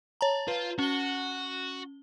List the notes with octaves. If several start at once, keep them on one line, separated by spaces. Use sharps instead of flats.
C#5 A5 A#5
F4 B4
C#4 F#4 G7